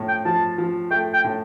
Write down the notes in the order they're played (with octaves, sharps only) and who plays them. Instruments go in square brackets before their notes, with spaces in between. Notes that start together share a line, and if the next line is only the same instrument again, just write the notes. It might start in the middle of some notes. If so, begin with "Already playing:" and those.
Already playing: [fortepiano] A2 F3
[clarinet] G5
[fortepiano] F3 [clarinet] A5
[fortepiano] F3
[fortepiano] A3 [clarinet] G5
[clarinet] G5
[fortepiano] A2